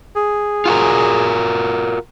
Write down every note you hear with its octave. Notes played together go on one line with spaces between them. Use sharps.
G#4
F4 F#4 A#4